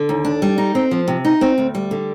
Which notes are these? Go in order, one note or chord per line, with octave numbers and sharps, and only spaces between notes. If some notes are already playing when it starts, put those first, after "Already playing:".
Already playing: D3
D#2
D4
G3
D#4
C4
F3
C3
D#4
C4
D2
G3
D3